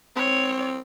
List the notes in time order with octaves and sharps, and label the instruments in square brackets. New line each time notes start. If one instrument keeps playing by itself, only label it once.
[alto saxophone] C4 [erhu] C#5